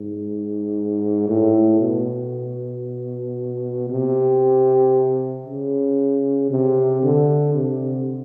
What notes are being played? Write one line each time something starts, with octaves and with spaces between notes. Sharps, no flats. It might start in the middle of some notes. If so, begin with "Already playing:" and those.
Already playing: G#2
A2
B2
C3
C#3
C3
D3
C3